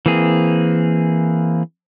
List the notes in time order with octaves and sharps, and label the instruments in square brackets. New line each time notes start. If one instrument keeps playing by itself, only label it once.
[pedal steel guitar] E3 A#3 C4 G#4